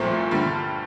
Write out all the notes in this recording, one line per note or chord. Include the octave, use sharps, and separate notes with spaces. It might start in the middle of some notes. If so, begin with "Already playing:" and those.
Already playing: C2 A#2 F3 A3 C4
G2 D3 G3